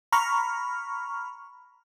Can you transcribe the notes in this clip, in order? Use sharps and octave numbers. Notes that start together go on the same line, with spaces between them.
A#5 B5 C#6 F6